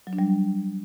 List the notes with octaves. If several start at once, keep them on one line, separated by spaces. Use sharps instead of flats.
F#3
D4
G3